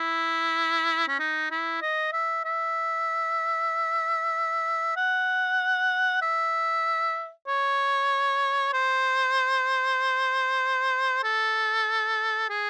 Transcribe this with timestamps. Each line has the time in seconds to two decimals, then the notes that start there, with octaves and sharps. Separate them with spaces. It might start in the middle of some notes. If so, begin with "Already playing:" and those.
Already playing: E4
1.08 C#4
1.20 D#4
1.51 E4
1.82 D#5
2.13 E5
2.45 E5
4.97 F#5
6.22 E5
7.47 C#5
8.73 C5
11.24 A4
12.50 G#4